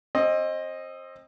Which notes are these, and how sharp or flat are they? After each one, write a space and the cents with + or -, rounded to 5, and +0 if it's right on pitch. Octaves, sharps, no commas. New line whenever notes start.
C4 +25 D#5 +0